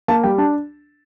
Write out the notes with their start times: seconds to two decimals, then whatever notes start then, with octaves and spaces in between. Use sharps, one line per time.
0.08 A#3 A5
0.24 G3 G5
0.38 D4 A5